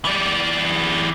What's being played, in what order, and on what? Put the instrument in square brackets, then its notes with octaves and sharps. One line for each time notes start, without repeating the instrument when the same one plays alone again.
[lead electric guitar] E3 D5